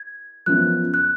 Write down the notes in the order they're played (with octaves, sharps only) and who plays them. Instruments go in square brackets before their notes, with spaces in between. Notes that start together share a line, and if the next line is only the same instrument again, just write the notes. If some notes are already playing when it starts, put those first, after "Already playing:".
Already playing: [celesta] G#6
[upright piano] F#2 F3 B3 [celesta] F#6
[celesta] F#6